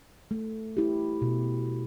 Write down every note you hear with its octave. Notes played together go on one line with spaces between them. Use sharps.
A3
E4 G4
B2